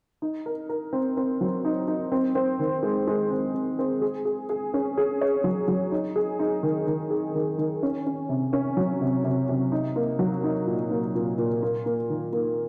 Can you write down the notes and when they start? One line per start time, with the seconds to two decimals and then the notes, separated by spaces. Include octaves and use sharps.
0.22 D#4
0.46 A#4
0.69 A#4
0.93 C4
1.17 C4
1.41 F#3
1.65 D#4
1.88 D#4
2.12 C4
2.35 C4
2.59 D#3
2.83 G#3
3.07 G#3
3.31 C4
3.54 C4
3.79 C4
4.01 G#4
4.25 G#4
4.49 G#4
4.74 C#4
4.97 G#4
5.21 C#5
5.44 F#3
5.68 F#3
5.92 D#4
6.16 G#4
6.39 D#4
6.63 D#3
6.87 D#3
7.10 G#4
7.34 D#3
7.58 D#3
7.83 C#4
8.06 C#4
8.29 C3
8.53 C#4
8.77 F#3
9.01 C3
9.24 C3
9.48 C3
9.72 D#4
9.96 A#3
10.19 F#3
10.44 D#4
10.67 A#2
10.91 A#3
11.15 A#2
11.38 A#2
11.63 A#3
11.86 A#3
12.10 D#3
12.33 A#3